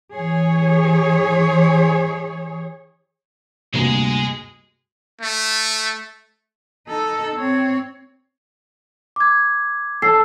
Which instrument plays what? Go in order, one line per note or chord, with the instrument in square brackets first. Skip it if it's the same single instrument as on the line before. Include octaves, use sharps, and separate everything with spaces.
[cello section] E3 G#4 C#5
[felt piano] D2 G2 [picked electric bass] C3 G3 A#3 [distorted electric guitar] G#3 G#4
[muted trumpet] A3
[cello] D#4 A4
C4 C#5
[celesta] D6 G#6
[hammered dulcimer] A4 [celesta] C7